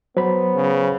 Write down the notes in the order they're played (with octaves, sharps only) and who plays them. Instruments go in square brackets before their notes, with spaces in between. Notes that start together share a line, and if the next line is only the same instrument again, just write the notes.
[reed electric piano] F#3 B5 [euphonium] B3 [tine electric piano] C5
[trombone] C#3